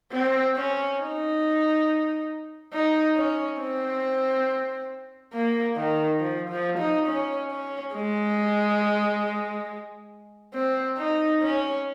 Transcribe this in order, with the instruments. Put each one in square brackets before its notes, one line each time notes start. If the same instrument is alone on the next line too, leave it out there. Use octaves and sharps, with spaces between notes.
[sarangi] C4
C#4
D#4
D#4
C#4
C4
A#3
D#3
F3
F3
D#4
C#4
C#4
G#3
C4
D#4
C#4